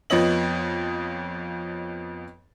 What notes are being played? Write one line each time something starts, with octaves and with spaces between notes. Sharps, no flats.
F2 F3 B3 C#5 D#5 F#7